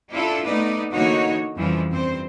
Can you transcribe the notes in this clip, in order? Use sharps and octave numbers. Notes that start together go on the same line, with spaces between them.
D4 E4 F4 A4
A3 B3 D#4 B4 D5
D3 E3 A#3 D#4 F#4 C#5
F2 C#3 E3 F3 G3
G2 C4 C5